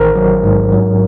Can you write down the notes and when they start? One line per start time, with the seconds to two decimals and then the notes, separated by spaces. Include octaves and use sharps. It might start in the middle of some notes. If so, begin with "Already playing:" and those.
Already playing: A1 D#3 A#4 C5
0.16 F#3
0.43 G#2
0.72 F#3